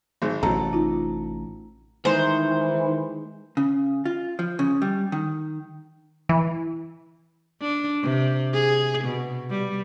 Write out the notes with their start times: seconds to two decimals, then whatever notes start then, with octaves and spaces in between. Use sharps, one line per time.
0.22 G#1 G#3
0.43 A1 C3 F#3 A4 A#5
0.73 D#4 F4
2.05 D#3 E3 G#3 D#4 C5
3.57 C#3
4.05 F4
4.39 F3
4.59 C#3
4.82 G3
5.12 D#3
6.29 E3
7.61 D4
8.03 C3
8.53 G#4
9.05 B2
9.50 G3